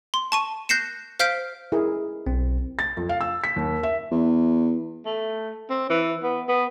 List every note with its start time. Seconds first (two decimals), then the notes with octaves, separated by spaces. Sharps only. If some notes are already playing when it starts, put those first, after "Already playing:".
0.14 C6
0.32 A5 C#6 D#7
0.69 F#6 G6 A#6 C7 C#7 E7
1.19 C5 F5 F6 G6 B6 D7
1.72 E4 G#4 A#4
2.27 B1 C4
2.79 A6
2.97 F2
3.09 F5
3.21 E6
3.44 B6
3.56 D#2
3.83 E5
4.11 E2
5.06 A3
5.70 C4
5.90 E3
6.23 B3
6.48 B3